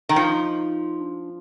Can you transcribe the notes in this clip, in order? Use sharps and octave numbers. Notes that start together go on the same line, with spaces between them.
D#3
F3 D#4
D4